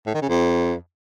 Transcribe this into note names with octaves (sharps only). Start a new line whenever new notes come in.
A2
D#3
C#3
F2